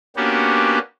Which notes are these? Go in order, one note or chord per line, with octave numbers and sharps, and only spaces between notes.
A#3 B3 C#4 D4 F#4 G4